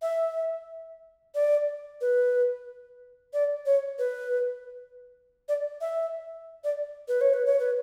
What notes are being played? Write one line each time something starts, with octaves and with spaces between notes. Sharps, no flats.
E5
D5
B4
D5
C#5
B4
D5
E5
D5
B4
C#5
B4
C#5
B4